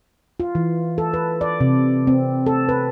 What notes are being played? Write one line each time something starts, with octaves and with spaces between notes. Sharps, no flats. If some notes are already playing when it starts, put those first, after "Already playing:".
F4
E3
A4
B4
D5
C3
C4
A4
B4